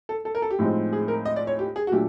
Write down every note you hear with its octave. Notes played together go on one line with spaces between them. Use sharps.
A4
A4
A#4
A4
G4
A2 F3 G#3 C4 D#4
G#4
A#4
D#5
D5
C#5
G4
G#4
F#4
A#2 F#3 A3 D4 G4